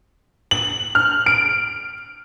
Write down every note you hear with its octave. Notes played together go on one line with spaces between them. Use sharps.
F#7
F6
D7